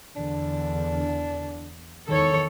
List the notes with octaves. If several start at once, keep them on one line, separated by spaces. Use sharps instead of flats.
E2 D3 D4
E2 D#3 A4 C#5